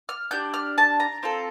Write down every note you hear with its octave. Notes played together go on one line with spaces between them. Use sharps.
F6
D4 G4 G6
F6
A5
A#5
C4 F4 A4